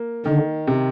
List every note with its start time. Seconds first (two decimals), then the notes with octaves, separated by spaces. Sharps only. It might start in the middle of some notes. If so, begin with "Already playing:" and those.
Already playing: A#3
0.26 D3 D#3
0.67 C3